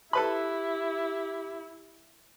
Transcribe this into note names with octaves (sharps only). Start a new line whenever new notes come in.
E4 G4 A4 B4 B5